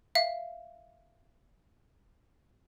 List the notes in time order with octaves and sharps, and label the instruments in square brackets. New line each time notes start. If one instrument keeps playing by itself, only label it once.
[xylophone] E5 F5